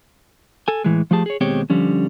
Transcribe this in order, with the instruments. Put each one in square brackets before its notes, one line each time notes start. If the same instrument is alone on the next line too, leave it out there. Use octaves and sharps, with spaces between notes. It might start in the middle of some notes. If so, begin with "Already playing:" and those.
[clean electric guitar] A4 G#5
A2 E3 G#3
F3 A3 G4 G#4 A5
G#4 C#5
D#2 B2 G#3 C4 G4 C#5
D3 F3 G3 C#4